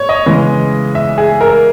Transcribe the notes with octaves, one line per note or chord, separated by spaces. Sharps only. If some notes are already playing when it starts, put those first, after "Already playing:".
Already playing: C#5
D#5
C#3 E3 G#3
E5
G#4
A#4